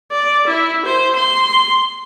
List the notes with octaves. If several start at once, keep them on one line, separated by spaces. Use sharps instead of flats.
D5
E4
C5
C6